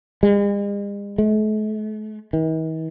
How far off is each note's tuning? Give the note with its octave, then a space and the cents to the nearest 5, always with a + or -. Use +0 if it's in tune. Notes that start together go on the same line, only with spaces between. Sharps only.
G#3 -45
A3 -40
D#3 +45